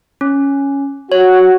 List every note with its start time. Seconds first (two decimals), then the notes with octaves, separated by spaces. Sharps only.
0.21 C#4
1.12 F#4 C#5